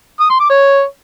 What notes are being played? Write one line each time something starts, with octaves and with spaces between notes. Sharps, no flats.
D#6
C6
D6
C#5